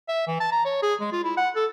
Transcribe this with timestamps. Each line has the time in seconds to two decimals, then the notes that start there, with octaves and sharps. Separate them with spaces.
0.09 E5
0.27 E3
0.40 A5
0.52 A#5
0.65 C#5
0.83 G#4
1.01 G#3
1.12 F4
1.24 E4
1.37 F#5
1.56 A4